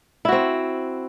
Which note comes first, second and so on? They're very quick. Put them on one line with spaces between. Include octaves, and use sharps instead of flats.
E4 F#4 C4